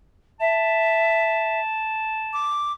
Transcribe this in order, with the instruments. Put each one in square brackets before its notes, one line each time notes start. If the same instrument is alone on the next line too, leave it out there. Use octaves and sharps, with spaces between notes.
[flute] E5 [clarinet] A5
[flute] D6